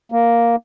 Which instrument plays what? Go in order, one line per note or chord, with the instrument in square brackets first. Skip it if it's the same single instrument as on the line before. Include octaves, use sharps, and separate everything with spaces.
[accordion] A#3